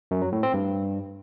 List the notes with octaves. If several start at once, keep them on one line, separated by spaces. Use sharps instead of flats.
F#2
F#3
A2
C4
G2